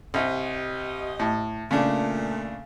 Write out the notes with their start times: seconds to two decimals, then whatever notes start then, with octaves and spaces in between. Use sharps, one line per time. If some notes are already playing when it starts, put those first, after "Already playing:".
0.14 C2 G4 D#5
1.19 A2
1.71 A#2 C#3 A3 D4